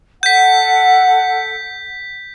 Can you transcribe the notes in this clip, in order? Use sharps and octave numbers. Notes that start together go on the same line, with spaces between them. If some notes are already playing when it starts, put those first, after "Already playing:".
A4 F#5 G6 B6